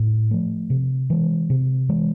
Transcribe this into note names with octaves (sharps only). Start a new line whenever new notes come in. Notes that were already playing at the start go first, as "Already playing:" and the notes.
Already playing: A2
F3 A3
C3
E3 G#3
C3
E3 G#3